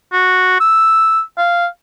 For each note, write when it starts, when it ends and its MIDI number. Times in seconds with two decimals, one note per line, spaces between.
0.12 0.58 66
0.60 1.21 88
1.38 1.66 77